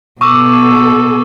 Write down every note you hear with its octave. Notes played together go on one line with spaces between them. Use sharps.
B2 A4 C#6 D6 E6